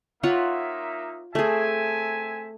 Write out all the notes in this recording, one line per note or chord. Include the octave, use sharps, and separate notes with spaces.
A#3 D#4 F4 C#5 E5 F#5
A3 C4 G#4 E5 G#5